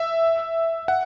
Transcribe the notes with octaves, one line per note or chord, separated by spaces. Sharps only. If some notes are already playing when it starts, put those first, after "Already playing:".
Already playing: E5
F#5